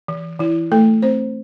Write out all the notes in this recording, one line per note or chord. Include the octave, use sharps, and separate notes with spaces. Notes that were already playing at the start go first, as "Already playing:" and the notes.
E3
E3 E4
A3 A4
C4 C5